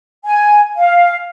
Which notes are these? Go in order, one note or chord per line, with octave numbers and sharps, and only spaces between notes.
G#5
F5